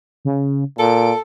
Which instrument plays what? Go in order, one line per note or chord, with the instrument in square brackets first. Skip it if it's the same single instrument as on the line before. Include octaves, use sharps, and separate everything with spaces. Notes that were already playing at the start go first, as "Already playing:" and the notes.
[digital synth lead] C#3
[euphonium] A#2 [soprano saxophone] A4 [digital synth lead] D7